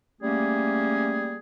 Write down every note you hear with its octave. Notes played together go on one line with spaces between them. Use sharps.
G3 A3 A#3 C#4 G#4